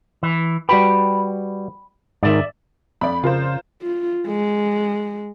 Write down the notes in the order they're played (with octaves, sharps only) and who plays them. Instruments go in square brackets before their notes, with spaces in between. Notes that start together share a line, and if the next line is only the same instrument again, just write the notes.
[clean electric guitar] E3
[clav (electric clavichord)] G3 F#4 B4 [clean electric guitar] G5 B5
[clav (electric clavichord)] G#2 D#3 [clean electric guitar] D5 E5
[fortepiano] F2 D5 [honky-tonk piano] B5
[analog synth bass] C#3 [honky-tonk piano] F4 A#4 C5
[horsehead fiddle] F4
G#3